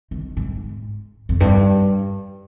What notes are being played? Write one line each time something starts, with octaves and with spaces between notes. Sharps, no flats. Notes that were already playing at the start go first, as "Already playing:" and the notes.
D#3
G#2
F2
G2